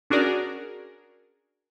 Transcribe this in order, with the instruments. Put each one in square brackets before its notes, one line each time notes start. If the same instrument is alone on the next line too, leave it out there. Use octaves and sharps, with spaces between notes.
[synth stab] C#4 D4 F#4 G#4 A#4 D5